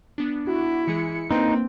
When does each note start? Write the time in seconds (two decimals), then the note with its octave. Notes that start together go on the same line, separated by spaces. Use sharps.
0.18 B3 D4
0.47 E4 F#4
0.88 E3 G#3 G#4 C#7
1.31 A#3 C4 D4 D#4 B4